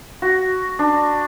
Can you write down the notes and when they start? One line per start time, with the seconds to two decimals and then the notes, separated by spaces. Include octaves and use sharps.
0.22 F#4
0.79 D4